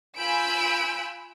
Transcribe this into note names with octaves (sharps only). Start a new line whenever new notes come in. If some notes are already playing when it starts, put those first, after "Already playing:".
F4 G#5 B5 E6 G6 D7